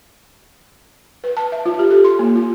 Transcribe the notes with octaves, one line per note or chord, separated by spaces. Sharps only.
B4
A5
E5
F4
G4
A4
C6
A#3
F4